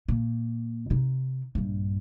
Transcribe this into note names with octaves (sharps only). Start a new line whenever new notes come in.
A#2
C3 D#4
A#1 G2